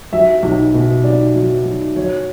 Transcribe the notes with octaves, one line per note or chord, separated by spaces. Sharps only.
F#3 E5
B1
B2
B1 D5
F#3
B1
F#3 C#5